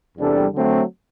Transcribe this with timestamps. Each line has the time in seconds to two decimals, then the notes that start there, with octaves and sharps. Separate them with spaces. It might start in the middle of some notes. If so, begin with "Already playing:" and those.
0.17 E2 C3 G3 D4 A4
0.53 D3 F#3 A3 C4